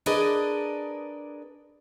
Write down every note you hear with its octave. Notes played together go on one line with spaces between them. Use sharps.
D4 G#4 A#4 B4 D5 D#5